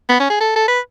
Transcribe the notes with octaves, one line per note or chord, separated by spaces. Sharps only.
B3
C#4
G#4
A4
A4
B4